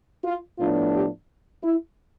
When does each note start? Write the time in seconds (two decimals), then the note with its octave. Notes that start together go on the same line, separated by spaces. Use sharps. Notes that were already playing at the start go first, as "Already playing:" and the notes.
0.24 F4
0.59 A2 F3 B3 D4 F4
0.94 G4
1.63 E4